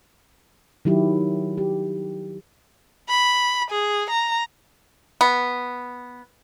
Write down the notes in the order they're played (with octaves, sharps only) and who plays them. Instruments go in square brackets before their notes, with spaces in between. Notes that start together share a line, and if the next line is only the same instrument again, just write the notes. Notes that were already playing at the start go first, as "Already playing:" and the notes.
[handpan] D#3 F#3 E4 G4
G4
[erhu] B5
G#4
A#5
[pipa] B3